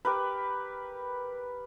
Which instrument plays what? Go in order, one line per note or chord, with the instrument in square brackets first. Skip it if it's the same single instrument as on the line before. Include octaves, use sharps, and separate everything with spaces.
[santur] G4 A#4 B4